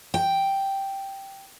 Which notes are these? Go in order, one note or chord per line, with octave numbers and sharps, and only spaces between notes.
G5